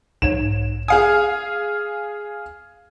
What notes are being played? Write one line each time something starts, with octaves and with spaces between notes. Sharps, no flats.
B1 G#2 C#5 E7
G#4 F5 G#5 D#6 C7